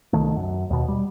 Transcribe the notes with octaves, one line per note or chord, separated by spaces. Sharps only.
C2 D#3 A3
F#2
D#2 B2
G3